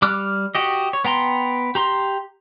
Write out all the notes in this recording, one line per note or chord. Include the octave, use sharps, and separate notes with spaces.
G3 D6 F6 F#6
F#4 G4 D#5
C#5
B3 G5 A#5 C6
G4 A#5 C6